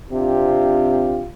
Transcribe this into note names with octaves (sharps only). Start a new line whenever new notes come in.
C3 C4 D4 F4 G4